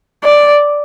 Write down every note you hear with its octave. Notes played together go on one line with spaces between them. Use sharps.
D5